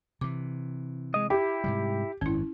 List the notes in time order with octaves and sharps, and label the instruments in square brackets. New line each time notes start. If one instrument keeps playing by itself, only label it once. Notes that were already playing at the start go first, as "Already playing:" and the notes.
[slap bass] C3 E3 [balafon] D6
[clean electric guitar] G#3 D#5
[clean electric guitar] E4 [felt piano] G4
[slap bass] G#2 C3 G3
[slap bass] G#1 F#2 [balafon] C#4 E4